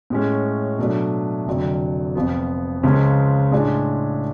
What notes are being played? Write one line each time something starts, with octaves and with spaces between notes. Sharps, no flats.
A2 G#3 C#4
B2 F#3 A3 D4
F1 F2 D3 F#3
F1 F2 F3 B3
C#2 C#3 F3 G#3 C#4
A2 G#3 D4 F4 G#4